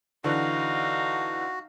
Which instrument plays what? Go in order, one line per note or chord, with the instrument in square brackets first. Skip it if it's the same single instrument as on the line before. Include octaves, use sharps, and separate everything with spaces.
[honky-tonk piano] D3 E3 [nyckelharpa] D#4 F5 [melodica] F#4